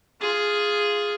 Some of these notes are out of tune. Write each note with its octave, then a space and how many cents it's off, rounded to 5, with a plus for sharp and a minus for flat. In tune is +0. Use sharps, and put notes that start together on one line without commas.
F4 +0 G#4 +0